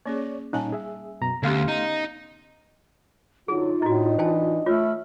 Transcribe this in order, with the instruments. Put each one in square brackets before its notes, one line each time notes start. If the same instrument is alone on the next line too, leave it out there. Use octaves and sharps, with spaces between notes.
[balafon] A#3 C#4 G#4 [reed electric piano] C#5 D5
[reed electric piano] A#2 C#4 D#4 [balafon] G3 G#5 A5
[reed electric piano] G#4 E5
F#2 B2 A#5
[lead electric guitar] D2 [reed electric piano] A3 F5 C6 [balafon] B3 C#4 G4
[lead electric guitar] D#4 [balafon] A#5
[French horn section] F#2 D3 F#3 [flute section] D#4 F4 [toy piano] G#4
[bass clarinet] A2 [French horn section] D4 D#5 [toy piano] E4 F#4
[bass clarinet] E3 [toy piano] C5 G5 A5
[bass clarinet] A3 [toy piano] F4 C#5 [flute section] B5 E6 F6